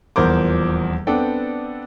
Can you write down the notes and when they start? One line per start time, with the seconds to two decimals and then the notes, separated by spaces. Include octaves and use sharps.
0.16 D#1 E2 F3 A#4 C5 D6
1.07 B3 C4 D4 A4 D5 G5